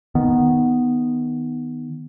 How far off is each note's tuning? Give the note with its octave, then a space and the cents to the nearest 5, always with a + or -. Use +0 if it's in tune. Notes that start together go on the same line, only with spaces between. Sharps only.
D#3 +0 B3 +0